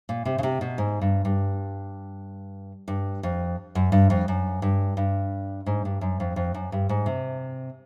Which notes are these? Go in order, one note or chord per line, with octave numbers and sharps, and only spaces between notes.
A#2
C3
C#3
C3
B2
G#2
G2
G2
G2
F2
F#2
G2
F2
F#2
G2
G2
G#2
G2
F#2
F2
F2
F#2
G2
G#2
C3